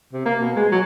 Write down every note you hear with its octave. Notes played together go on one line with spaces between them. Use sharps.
C3
A#3
B2
G#3
F#3